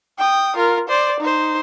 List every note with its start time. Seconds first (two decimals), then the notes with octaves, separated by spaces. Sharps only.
0.18 G5 D#6
0.56 F4 A#4
0.88 C5 D5
1.20 D#4 C5